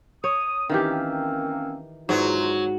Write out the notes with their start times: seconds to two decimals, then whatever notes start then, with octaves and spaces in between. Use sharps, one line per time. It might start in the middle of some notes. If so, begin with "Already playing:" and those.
0.24 C#5 D#6
0.69 D#3 E3 A#3 C4 C#4 G4
2.09 E2 G#2 F#3 D#4 F4